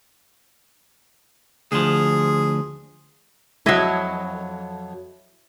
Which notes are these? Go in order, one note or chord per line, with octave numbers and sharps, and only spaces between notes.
D2 F3 G#4
F2 F#3 E4 D#5 E5